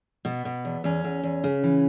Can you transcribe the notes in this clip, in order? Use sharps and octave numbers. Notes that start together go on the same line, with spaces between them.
B2 B3
B2
E2
E2 C#4
E2
E2
C#3
E3